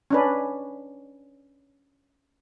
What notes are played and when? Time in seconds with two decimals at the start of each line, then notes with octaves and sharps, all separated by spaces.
0.11 C#4 D4 B4